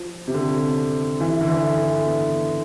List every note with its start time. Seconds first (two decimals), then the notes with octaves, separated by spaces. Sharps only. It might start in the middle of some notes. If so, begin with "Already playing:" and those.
Already playing: F3
0.27 C3
0.34 D3
1.20 E3
1.41 D3
1.48 E3
1.77 D3
2.05 B3